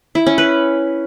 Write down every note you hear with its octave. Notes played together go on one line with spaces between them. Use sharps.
E4
C#4
B4